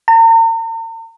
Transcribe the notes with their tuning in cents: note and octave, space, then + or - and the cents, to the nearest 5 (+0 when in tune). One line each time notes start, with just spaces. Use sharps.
A#5 -45